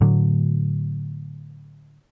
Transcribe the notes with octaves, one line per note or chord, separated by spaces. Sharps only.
A2 D3 F#3